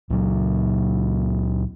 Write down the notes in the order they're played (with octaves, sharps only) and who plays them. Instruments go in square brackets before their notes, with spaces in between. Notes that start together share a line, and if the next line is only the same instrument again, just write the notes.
[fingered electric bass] C#2 A#2 F#3